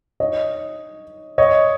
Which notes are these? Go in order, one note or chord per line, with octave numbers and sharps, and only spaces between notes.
C#5 D#5
C#5 D#5